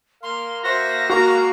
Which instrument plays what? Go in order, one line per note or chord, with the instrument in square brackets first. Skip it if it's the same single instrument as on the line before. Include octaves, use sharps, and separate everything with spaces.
[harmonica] A#4 F5 [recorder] C6
[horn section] F#4 C5 E5 [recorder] A#6
[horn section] G#3 A#3 A#5 [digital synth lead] F#4